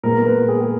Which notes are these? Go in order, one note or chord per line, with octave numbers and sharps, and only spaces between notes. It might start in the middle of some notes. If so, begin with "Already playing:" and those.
A#2 G#3 B3 A#4
B4
G#4